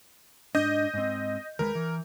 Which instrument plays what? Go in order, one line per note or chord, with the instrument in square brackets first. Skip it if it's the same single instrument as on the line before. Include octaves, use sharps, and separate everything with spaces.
[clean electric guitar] G#2 D4 [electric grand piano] D#5 G6
[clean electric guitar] G#2 C4
[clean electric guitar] D#2 G#3 B4 [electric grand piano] A#4
[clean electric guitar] E3